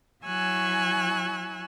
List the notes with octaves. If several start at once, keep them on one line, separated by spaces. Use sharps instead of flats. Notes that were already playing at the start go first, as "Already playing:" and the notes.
F#3 E4 G#5 C#6 E6 F#6